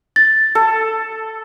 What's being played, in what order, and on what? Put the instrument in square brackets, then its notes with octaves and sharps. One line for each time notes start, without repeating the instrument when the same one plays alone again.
[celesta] A6
[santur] A4